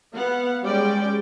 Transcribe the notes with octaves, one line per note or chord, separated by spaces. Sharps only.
B3 F5 F#5
G3 G#3 C#4 D5 G5